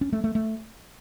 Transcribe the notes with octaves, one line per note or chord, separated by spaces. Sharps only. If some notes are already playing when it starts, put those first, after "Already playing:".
C#4
A3
A3
A3